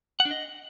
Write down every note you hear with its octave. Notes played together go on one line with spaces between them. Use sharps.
F#5
D4
D#5